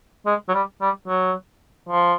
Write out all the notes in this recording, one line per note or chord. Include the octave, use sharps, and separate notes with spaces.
G#3
F#3
G3
G3
F#3
F3